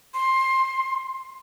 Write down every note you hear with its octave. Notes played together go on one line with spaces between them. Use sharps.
C6